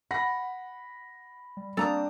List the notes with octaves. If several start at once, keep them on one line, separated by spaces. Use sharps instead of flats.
F#5 B5 A#6
G3
G3 A#3 C4 D4 A4 A#5 D#6